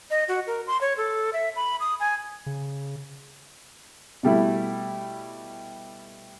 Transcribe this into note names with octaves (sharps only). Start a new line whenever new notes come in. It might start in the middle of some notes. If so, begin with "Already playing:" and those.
D#5
F#4
A#4
C6
C#5
A4
E5
B5
D#6
G#5
C#3
B2 G3 A3 E4